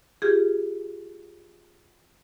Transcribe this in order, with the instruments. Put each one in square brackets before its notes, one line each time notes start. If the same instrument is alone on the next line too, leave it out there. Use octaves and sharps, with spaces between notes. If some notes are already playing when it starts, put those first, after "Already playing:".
[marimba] F4 G4 G#4